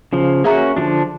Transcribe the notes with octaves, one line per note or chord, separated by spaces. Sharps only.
C#3 F3
A#3 C#4 F#4 G#4 E5 A#5
D3 F3 D4